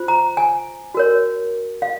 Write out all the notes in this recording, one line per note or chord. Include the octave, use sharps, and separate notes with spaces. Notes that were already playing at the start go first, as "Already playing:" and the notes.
Already playing: F4 C5
A#5
G#5
F#4 A#4 C#5
F5